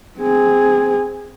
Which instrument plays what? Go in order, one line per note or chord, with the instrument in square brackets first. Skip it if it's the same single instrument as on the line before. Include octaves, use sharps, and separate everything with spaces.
[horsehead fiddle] C4 G#4